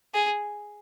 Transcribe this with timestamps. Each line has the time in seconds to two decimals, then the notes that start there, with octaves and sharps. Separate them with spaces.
0.14 G#4